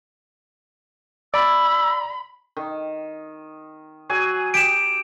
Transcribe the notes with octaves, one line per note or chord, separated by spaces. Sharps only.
D5 B5 E6
D#3
F#3 G#4 G#5
G4 D7 E7